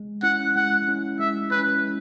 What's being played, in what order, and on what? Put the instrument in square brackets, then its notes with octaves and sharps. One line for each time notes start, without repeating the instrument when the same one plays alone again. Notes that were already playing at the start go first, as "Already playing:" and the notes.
Already playing: [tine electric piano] G#3
[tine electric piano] C#4 E4 [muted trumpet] F#5
[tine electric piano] G#3 [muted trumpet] F#5
[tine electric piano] C#4 E4
[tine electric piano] G#3 [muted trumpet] E5
[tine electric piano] C#4 E4 [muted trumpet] B4
[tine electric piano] G#3